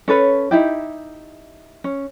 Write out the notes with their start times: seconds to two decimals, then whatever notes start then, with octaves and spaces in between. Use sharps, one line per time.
0.08 C#4 A4 B4 C#5
0.51 D#4 E4 G4
1.84 C#4